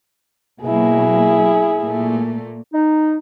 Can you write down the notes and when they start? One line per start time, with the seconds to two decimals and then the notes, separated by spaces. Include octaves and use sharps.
0.62 B2 F#3 A#3 E4 G#4
1.80 A#2 A3 A#3
2.73 D#4